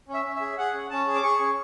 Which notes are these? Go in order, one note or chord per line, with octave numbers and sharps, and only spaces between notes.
C#4
E5
C#4
E5
G#4
G#4 F#5
C#4
C#4 A5
G#4
D6
G#4 C#6
C#4